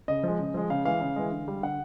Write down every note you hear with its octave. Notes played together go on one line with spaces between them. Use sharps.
C#3 D#5
F3 G#3
C#3
F3 G#3
C#3 F5
E3 G#3 F5
C#3
E3 G#3
D3
G3
D3 F#5